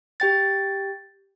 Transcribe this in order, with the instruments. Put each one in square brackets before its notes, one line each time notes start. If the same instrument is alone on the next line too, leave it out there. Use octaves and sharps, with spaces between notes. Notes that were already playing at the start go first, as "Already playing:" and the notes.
[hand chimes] G4 G5 A6